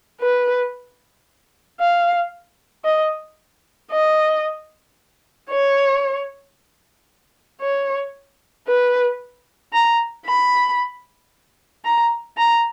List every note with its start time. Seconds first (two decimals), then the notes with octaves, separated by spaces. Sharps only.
0.20 B4
1.80 F5
2.85 D#5
3.91 D#5
5.49 C#5
7.61 C#5
8.67 B4
9.73 A#5
10.26 B5
11.84 A#5
12.37 A#5